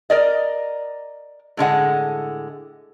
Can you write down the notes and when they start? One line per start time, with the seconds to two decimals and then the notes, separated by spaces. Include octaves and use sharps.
0.10 A#4 D5 D#5
1.57 A2 D3 G#3 F#5